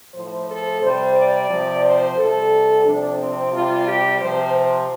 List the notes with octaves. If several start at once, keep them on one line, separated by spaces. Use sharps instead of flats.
A2 F3 C5
A4
C3 G3 C5
D5
C3 F3
C5
C3 G3 A4
C3 F3 D4
C4
C3 G3 F4
G4
C3 F3 C5
C5